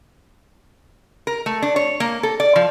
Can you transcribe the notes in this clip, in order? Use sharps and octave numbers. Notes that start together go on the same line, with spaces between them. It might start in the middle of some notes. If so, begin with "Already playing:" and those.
A#4
A3
D4
C#5
A#3
A4
D5
F3